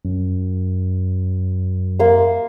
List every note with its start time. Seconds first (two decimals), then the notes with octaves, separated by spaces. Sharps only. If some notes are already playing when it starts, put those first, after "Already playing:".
0.05 F#2
1.99 A#3 C6